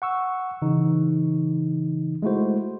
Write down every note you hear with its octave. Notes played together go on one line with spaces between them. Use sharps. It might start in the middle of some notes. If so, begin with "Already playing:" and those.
F#5 C#6 E6
C#3 E3 D#4
G#3 A3 E4 F#4 C5